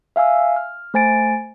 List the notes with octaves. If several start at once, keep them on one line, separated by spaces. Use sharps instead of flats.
E5 F5 G#5 E6
F6
A3 C5 G#5 A6 D7